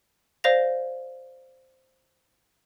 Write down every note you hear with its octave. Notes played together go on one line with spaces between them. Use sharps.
C5 D5 F5 A#6 F7